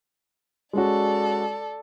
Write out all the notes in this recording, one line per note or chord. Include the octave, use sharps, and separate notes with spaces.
G#3 C#4 F#4 A4 D5